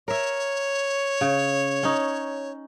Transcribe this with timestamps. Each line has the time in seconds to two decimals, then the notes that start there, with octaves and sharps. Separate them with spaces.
0.08 A#4 C#5 E5
1.21 C#3
1.83 C#4 D#4